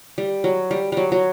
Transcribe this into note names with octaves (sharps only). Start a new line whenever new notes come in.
G3
F#3
G3
F#3 G3
F#3